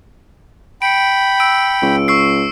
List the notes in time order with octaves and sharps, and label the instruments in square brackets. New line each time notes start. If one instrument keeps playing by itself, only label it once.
[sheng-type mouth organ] G5 B5 [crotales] C#7 D7
[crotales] E6 D7
[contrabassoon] C#2
[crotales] C#6 E6 C7